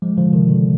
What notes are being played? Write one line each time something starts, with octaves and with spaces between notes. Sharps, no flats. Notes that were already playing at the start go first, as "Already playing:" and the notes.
F3 G#3
D3 F3
C3 D#3
D3